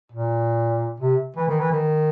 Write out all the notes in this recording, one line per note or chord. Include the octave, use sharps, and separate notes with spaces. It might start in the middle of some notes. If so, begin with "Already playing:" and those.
A#2
C3
E3
D#3
E3
D#3